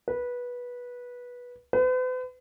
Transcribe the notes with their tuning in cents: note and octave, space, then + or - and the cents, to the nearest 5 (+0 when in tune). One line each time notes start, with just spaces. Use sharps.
B4 -15
B4 +45